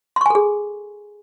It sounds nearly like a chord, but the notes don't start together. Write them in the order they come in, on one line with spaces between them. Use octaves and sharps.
C6 C#6 G#5 A4 G#4